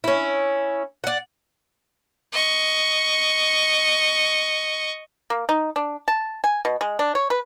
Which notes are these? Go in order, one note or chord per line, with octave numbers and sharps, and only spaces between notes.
C#4 E4
D5 F#5
D#5 C#6
A#3
D#4
D4
A5
G#5
B2
G#3
D4
C#5
B4